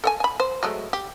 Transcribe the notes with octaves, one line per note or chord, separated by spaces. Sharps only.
A4 G5 G#5
G#5 B5
C5
F#3 G#3 A3
G4